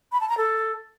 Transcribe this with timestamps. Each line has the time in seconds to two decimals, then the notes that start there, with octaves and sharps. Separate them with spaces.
0.12 B5
0.21 A5
0.29 A#5
0.38 A4